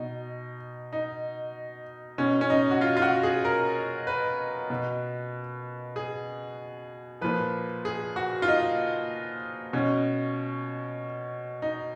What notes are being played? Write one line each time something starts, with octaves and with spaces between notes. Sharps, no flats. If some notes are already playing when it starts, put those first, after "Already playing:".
Already playing: B2 D#4
D#4
B2 C#4
C#4
D#4
F#4
F4
F4
F#4
G#4
A#4
B4
B2
G#4
A#2 F3 B4
G#4
F#4
F4
D#4
B2 C#4
D#4